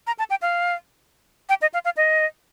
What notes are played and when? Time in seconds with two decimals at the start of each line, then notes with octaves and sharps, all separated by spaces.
0.07 A#5
0.19 A5
0.30 G5
0.42 F5
1.49 G5
1.62 D#5
1.74 F5
1.85 F5
1.97 D#5